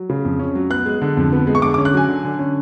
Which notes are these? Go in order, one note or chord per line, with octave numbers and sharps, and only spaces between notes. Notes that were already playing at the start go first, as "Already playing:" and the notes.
Already playing: F#3
C#3
F2
C#4
F#3
B3 F#6
G#3
D3
F2
B3
G#3
C#6
D3 D6
D6
C#4
F#6
F#3 G#5
D3
D3
C#4